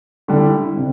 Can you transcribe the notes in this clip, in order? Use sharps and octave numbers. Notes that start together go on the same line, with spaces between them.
D3 G3 E4
C3